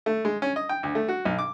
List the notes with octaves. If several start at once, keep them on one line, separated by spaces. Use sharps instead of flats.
A3
G#3
C#4
D#5
G5
D2
A3
F#4
B1
D6